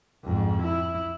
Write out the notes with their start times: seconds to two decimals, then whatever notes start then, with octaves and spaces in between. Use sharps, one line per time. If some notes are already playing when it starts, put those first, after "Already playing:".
0.24 F2 G#2
0.62 E4